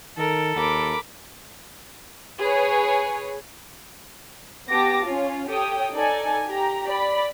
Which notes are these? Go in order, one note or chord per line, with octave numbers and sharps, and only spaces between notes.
D#3 A4 A#4
D#2 A#4 B5 D6
G#4 B4 C#5
B3 G4 A5 D6 A#6
C#4 F4
G4 A4 C#5 G5 D#6
D#4 A4 D5 G#5
G4 A#5
D5 B5